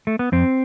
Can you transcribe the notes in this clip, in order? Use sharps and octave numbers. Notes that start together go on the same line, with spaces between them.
A3
B3
F2 C4